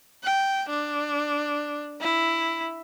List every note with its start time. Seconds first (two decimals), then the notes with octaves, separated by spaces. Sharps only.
0.24 G5
0.69 D4
2.01 E4